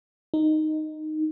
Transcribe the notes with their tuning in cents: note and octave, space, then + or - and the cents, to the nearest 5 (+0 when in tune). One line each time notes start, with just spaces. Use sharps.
D#4 -5